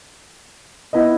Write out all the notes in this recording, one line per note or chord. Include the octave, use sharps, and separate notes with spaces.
B3 E4 B4 D#5